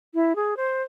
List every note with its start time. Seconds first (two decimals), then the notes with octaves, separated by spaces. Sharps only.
0.14 E4
0.36 G#4
0.57 C5